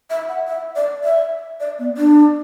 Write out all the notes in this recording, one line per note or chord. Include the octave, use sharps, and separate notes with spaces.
E5
F#5
E5
D5
E5
D5
B3
D4